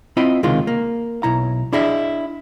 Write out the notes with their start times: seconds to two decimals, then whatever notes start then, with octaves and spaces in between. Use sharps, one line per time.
0.17 C4 E4 F4 D#5 G5 B5
0.43 C#2 C3 D#3 G#3 F4
0.67 A#3
1.23 B1 E4 A#5
1.73 D4 E4 G#4 D#5 E5